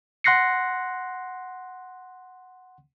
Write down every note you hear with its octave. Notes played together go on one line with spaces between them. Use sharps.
F#5 C6 F#6 A#6 C7 C#7